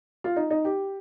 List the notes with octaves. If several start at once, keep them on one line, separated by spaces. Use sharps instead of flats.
F4
D#4
D#4
G4